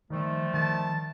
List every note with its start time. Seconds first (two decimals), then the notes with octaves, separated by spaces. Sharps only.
0.10 D#3 F3 G3 A3
0.54 D#3 A5